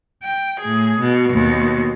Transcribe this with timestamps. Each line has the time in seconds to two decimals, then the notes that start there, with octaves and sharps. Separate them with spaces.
0.24 G5
0.61 A2 G#4
1.00 B2
1.33 D#2 B2